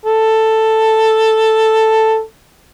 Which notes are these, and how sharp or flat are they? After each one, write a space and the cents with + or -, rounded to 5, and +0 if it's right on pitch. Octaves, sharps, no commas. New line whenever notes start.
A4 +5